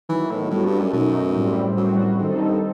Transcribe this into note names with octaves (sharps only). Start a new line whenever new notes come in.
D#3 E3 F#3 B3 E4
A2
A2 G3 B3 F#4 A4
G2
F#2
F#2 B2 A3 D#4
A2 G3 C4
F#2 A2 G3 C4 F#4
F#2
F#2 D#3 G3 C4 D#4 A4
G2